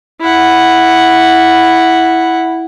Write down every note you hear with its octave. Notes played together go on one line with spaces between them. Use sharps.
E4 F#5